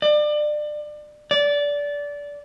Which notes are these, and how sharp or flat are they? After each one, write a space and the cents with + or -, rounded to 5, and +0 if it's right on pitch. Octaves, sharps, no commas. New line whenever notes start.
D5 +30
D5 -20